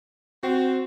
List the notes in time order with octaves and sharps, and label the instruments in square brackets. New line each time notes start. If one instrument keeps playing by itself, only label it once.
[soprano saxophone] C4 [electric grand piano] F#4